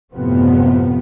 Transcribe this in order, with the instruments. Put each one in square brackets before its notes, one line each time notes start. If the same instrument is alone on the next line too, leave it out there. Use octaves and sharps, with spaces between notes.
[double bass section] F#1 A2 C3 F3 B3 C4